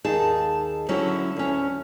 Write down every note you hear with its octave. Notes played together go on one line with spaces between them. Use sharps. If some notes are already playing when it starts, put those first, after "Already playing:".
D#2 D#4 G#4 A5
D3 F#3 C#4 E4 F#4
D2 C#4